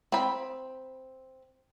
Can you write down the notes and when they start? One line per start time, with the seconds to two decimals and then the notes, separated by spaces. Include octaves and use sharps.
0.12 C4 B5